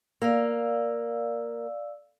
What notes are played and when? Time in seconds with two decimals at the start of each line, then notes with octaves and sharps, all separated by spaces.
0.22 A#3 D5 F5 E6